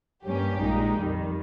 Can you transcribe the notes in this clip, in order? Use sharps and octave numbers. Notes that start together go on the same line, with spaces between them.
G2 G3 A#3 C#4 G4
A#1 A#2 G#3 D#4
F2 D#3 G3